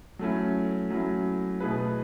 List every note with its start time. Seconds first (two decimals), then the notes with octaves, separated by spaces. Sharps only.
0.19 F#3 A3 C#4 E4
0.90 F#3 A3 C#4 E4
1.60 B2 A3 E4 G#4 B4